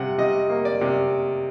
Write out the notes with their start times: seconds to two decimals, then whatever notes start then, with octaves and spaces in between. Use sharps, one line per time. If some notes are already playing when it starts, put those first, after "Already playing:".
Already playing: C3 G3 F#5
0.18 C3 D#5
0.50 A#3
0.65 D5
0.81 C3